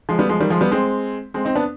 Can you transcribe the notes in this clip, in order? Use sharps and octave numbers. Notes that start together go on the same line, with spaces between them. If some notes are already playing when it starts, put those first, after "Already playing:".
F3 G#3
G3 B3
F3 G#3
D#3 G3
F3 G#3
G3 B3
G#3 C4
G#3 C4
C4 D#4
B3 D4